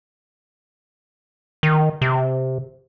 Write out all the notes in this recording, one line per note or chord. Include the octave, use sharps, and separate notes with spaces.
D#3
C3